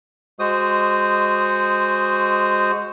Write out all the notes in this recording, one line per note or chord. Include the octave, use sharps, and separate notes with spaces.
G#3 F#4 C5 D#6